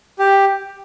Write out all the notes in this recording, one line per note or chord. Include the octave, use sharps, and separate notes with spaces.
G4